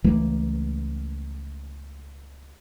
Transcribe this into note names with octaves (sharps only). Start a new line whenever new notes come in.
C#2 E3 A3 A#3